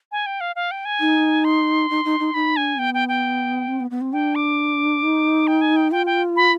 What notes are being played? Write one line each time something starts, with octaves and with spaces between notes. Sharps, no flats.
G#5
G5
F5
F5
G5
G#5
D#4
C6
D#4
D#4
D#4
D#4 B5
D4 G#5
B3 G5
G5
G5
C4
B3
B3
C4
D4 G5
D6
D#4
G5
G#5
G5
F4 G5
G5
B5